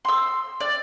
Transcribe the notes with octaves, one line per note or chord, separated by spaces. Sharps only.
C6 E6
D5